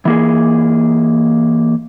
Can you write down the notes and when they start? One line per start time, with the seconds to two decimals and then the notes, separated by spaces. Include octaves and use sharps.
0.05 E3 A#3 G#4